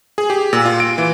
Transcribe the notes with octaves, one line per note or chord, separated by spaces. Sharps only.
G#4
G4
A#2
F4
D7
E3